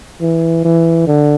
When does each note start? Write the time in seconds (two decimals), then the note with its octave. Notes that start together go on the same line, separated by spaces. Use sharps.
0.21 E3
0.65 E3
1.07 D3